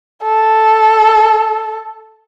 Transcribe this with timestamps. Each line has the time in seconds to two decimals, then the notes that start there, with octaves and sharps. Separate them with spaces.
0.23 A4